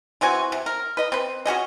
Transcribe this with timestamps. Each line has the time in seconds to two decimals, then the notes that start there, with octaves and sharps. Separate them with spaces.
0.21 E3 C4 F#4 G#5
0.52 C3
0.66 A#4
0.97 B4 D#5
1.12 C4 B4
1.46 C#4 F#4 G#4 D#5